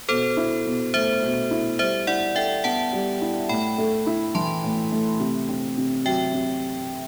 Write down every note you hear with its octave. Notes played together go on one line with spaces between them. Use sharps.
B2 A4 C5
E4
B2
A3 C5 E5
B2
E4
G3 C5 E5
E4 D5 F#5
A4 E5 G5
B3 F#5 A5
G3
E4
A2 G5 B5
A3
E4
E3 A5 C6
A2
A3
C3
C4
C3
F#3 E5 G5
C3